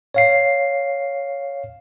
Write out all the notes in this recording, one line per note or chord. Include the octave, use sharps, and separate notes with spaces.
C#5 F5 C7